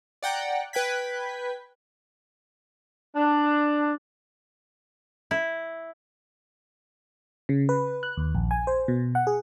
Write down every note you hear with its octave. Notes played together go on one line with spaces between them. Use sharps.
D5 F#5 G5 A#5
B4 G5 F#6 G#6 B6
D4
E4
C#3
B4
F#6
D#2
A#1
G#5
C5
B2
F#5
G#4